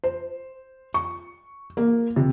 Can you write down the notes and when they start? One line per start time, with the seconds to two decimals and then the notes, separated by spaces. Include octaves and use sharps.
0.04 C5
0.94 C#6
1.77 A#3
2.16 C3